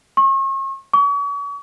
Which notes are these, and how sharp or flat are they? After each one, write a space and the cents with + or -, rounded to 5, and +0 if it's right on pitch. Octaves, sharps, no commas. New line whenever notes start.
C#6 -40
C#6 +40